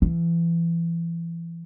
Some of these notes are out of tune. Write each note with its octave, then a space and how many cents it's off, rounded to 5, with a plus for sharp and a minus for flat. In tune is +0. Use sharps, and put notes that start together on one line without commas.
E3 +30